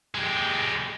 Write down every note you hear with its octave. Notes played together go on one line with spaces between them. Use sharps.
G#3 G4